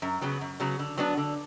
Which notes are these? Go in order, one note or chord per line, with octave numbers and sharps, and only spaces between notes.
F#2
C#3 F#3 B3
F#2
C#3 F#3 B3
D3
F#3 B3 D4
D3